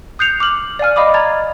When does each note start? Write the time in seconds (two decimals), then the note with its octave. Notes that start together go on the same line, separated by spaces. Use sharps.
0.19 D#6 F#6 G6 C7 C#7 F7
0.40 D6 F6 F#7
0.79 D5 F5 G#5 F6
0.96 D#5 F5 B5 D6 D#6
1.14 G#5 A#5 G#6 A6